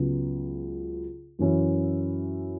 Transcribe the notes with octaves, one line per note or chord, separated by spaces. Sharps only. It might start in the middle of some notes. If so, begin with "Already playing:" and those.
Already playing: C#2 C#3 F#3 B3
F#2 E3 C#4 E4